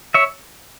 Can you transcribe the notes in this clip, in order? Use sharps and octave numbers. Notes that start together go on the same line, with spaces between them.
C#5 E5